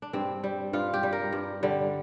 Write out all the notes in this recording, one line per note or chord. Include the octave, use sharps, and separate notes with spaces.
D4
G2 C4
G3
G2 F4
G4
G3
A#4
G2
D3 G3